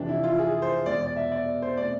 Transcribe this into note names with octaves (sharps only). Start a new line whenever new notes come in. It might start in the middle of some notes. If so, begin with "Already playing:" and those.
Already playing: F2 C3 E3 D4
E4
F4
G#4
C5
E2 B2 G#3 D5
D5
E5
D5
C5
B2 A3 C4 D5